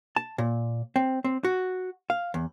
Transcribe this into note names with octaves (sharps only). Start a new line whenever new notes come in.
A5
A#2
C4
C4
F#4
F5
E2